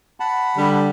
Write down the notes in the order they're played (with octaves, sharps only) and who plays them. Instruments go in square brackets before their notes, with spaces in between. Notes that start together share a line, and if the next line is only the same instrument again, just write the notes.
[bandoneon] F#5 A5 B5
[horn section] D3 G3